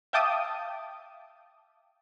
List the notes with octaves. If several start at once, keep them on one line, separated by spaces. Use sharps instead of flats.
E5 F5 G5 A5 D6 D#6